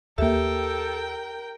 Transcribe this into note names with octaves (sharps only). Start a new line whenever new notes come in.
D#2 A#3 G4 A4 A#4 E5 G5